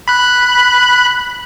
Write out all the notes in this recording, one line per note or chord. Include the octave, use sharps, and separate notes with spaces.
B5 F#6